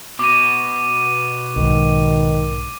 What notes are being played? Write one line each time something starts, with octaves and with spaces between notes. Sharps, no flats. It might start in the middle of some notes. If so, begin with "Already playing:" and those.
B2 D6 D#7
B1 G#2 D#3